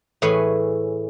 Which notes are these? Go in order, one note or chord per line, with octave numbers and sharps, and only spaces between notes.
A2 E3 G#4 B4 C#5 G#5